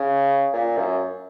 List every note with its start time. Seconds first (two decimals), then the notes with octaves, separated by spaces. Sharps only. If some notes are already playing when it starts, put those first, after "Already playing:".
Already playing: C#3
0.53 A#2
0.77 F#2